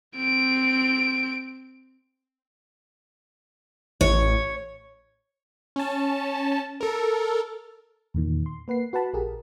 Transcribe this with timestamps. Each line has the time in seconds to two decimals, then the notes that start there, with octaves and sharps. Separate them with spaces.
0.16 C4 D7
4.01 A1 C#5
5.76 C#4 A5
6.81 A4 A#4
8.14 E2 A#2 D#3
8.46 C6
8.68 A#3 B4 F#5 C7
8.93 F#4 B4 F#5 A5 B5
9.14 A#1 G4 G#4 A#4